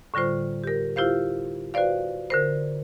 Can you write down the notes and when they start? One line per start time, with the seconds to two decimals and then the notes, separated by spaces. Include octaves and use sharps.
0.14 A2 D3 G3 F4 C5
0.64 G4 A#4
0.96 E4 F4 G4 C5 F5
1.74 F#4 B4 C5 D5 F5
2.30 D3 A#4 C5